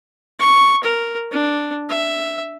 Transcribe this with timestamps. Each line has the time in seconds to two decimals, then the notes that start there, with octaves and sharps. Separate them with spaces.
0.40 C#6
0.83 A#4
1.32 D4
1.90 E5